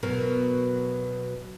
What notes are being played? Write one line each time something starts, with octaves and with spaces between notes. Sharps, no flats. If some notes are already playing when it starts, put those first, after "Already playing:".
B2 F#3 A#4